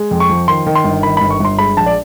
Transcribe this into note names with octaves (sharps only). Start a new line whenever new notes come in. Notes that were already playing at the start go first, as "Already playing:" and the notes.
Already playing: G#3
F2
C#6
F3
D#3 C6
D#3
C6
G1
D#3 B5
G1 B5
C#6
G1 C6
G#3 B5
A#1 A5
D5